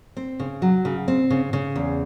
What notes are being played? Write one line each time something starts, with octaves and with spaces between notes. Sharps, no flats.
C4
C#3
F#3
C#3
C4
C#3
C#3
E2